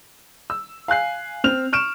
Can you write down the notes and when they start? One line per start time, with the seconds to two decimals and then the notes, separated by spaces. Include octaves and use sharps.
0.50 E6
0.88 F5 G#5 F#6 C7
1.44 C4 F6 F7
1.73 C#6 F6 D7 E7